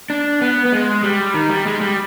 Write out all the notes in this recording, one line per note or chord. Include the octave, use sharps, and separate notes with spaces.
D4
B3
B3
G#3
G3
D#3
G3
G#3
G3